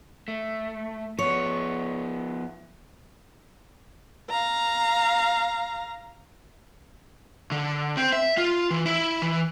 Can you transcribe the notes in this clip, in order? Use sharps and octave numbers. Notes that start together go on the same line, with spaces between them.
A3
F3 B3 C#5
F5 A#5
D3
C4
E5
F4
E3
E4
E3